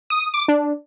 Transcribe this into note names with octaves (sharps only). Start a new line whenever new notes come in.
D#6
D6
D4